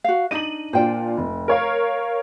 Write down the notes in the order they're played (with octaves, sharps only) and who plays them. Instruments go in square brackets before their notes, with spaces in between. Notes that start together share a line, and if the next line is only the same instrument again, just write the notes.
[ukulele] F#4 F5
[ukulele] D4 D#4 D#5 [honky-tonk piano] D#7 F#7
[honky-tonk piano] A#2 D4 F4 [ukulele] C5 G5
[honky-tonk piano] F1
A#4 C#5 F5